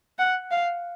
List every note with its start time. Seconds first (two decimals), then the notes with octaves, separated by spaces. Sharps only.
0.19 F#5
0.51 F5